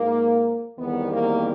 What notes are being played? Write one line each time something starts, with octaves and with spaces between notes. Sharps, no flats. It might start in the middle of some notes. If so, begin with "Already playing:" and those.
Already playing: G#2 F3 A#3
E2 C3 D#3 G3 B3
A#3